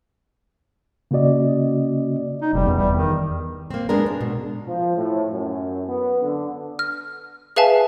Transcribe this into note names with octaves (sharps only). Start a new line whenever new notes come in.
C#3 A#3 C#4 F#4 D5 D#5
D#4
F1 G3
E2
G3
D#3
A#3 C4
G#3 B3 D4 A#4
D4
B2
F3
A2
F#2
B3
D3
F6
G#4 B4 E5 F5 G#5 A5